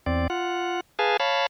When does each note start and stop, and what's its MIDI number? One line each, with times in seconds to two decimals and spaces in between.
0.06 0.27 40
0.06 0.27 60
0.06 0.27 74
0.30 0.80 65
0.30 0.80 78
0.99 1.17 68
0.99 1.17 71
0.99 1.17 77
0.99 1.17 80
0.99 1.17 81
1.20 1.46 73
1.20 1.46 77
1.20 1.46 81
1.20 1.46 83